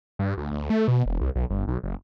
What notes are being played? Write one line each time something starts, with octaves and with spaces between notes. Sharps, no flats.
G2
D2
D2
A3
B2
E1
C2
B1
G1
B1
F#1